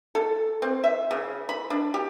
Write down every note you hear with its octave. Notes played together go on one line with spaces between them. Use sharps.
A4
C4
E5
C#3
B5
D4
G4